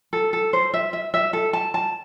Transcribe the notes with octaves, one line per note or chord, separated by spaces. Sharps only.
A4
A4
C5
E5
E5
E5
A4
A5
A5